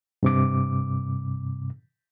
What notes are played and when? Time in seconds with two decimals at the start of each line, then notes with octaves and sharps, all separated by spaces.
0.23 G2 C3 D6